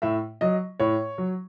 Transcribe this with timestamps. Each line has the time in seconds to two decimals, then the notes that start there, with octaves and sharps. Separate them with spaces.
0.02 A2 E5
0.41 F#3 D#5
0.80 A2 C#5
1.18 F#3